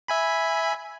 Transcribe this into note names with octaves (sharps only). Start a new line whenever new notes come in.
E5 G#5 B5